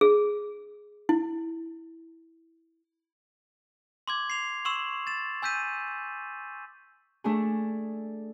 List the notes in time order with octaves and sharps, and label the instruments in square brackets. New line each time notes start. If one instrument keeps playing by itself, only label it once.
[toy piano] G#4
E4
[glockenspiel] C6 D6 G#6
C7 F7
C6 C#6 E6 E7 F#7
A6 E7
G#5 E6 G6 B6 D#7
[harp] A3 D4 G#4